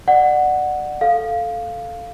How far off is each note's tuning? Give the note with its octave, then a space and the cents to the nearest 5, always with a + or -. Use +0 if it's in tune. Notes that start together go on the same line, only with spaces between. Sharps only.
D5 +30 F#5 +0
A4 +0 F5 +0